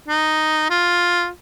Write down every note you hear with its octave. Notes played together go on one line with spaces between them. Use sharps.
D#4
F4